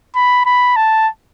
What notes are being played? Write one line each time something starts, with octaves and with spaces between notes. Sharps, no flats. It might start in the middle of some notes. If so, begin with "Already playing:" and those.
B5
B5
A5